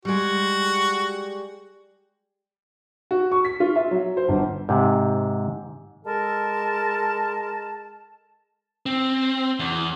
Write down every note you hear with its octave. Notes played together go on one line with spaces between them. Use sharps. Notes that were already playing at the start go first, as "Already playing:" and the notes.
G3 G#3 F#4
F#4
C#6
B6
F4
E5
F#3
C5
G1
G#2 C3
G#3 A4 A#4 A5
C4
E2